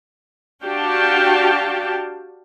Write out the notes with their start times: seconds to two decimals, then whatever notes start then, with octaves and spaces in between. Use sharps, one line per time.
0.64 D4 F#4 G4 F5 G5 A5